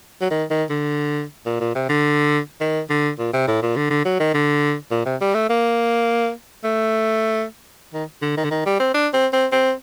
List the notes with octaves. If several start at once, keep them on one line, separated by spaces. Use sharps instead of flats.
F#3
D#3
D#3
D3
A#2
A#2
C3
D3
D#3
D3
A#2
C3
A2
A#2
D3
D3
F#3
D#3
D3
A#2
C3
G3
A3
A#3
A3
D#3
D3
D#3
D3
D#3
G3
C4
D4
C4
C4
C4